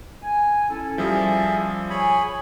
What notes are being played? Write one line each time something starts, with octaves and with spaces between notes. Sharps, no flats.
G#5
C#4 E4 A4
F3 G3 G#4 E5
G#4 C#5 G#5 B5